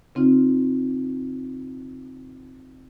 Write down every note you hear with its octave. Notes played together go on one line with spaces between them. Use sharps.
C#3 C4 D#4 F4